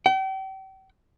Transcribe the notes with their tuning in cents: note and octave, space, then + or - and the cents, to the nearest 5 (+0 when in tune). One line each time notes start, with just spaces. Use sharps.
G5 -40